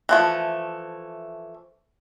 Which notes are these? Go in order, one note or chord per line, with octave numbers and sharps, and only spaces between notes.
E3 F3 A3